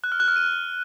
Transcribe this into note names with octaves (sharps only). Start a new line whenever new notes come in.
F#6
F6
F#6
F6
D#7